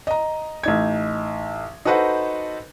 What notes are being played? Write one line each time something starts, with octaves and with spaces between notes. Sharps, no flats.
D#5 A#5
A1 D#4 G#6
D#4 F#4 A4 B4 C5 F#5